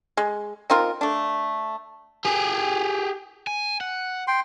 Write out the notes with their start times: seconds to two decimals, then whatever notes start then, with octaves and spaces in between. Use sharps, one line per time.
0.17 G#3
0.70 C4 D#4 F4 A#4
1.01 A3 D4
2.25 G4 G#4
3.47 G#5
3.81 F#5
4.28 G5 C6